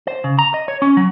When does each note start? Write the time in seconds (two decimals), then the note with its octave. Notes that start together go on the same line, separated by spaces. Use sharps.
0.07 C5
0.24 C#3
0.39 A#5
0.54 D#5
0.68 C#5
0.82 C#4
0.97 F#3